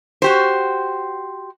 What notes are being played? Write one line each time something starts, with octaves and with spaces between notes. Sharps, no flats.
F#4 G4 C5